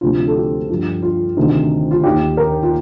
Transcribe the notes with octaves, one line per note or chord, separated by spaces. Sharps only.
D2 C3 F3 F4
A4
G4
G2 F3
F4
D2 C3 D#3
F4
D#2 D#3 G4
A#4
F4